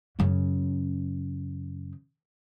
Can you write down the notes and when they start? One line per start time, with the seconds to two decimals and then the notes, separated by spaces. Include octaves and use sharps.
0.19 F#2 C#3